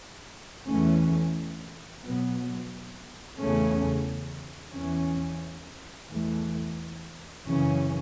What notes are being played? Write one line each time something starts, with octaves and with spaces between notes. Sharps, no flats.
E2 E3 A3 C#4
B2 F#3 B3
E2 C#3 A3 C#4
E2 E3 C#4
E2 E3 A3
F#2 C#3 E3 C#4